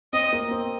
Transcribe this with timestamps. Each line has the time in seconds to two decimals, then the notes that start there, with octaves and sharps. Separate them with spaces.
0.13 C4 D#5
0.33 A#3
0.51 C4